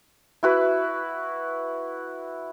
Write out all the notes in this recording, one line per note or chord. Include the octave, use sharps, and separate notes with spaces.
E4 F#4 B4